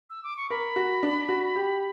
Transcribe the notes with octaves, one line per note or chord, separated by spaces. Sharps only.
E6
D6
C#6
A#4 B5
F#4
D4
F#4
G4